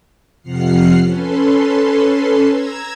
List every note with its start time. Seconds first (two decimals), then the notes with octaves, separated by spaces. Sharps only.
0.43 F2 C3 F3 F#5 F6 C7
1.01 C#4 A4 B4 C6
2.48 A#5 E6 G#6